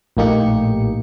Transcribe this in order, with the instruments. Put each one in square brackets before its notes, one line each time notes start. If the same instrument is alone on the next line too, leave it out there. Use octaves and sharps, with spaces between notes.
[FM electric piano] A#1 A2 A#3 D#4 G4 C#7